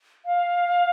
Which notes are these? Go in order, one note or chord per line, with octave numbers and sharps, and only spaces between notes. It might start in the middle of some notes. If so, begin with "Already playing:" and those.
F5